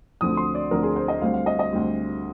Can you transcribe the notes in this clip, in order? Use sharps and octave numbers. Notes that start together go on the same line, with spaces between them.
D2 D3 F3 C4 D#6
C6
D5
D2 D3 F3 C4 A#4
G#4
C5
D#5
D2 D3 G3 C4 F5
F5
D#5
D#5
D2 D3 G3 C4